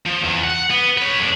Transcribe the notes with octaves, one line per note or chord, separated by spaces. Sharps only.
F3
E2
F#5
B3
B4 C#5
F2 D4